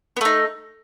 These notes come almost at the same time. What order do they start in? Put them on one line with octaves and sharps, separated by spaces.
B3 A3 D#4